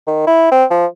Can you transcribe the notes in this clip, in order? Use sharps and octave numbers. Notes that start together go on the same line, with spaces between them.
D#3
E4
C4
F3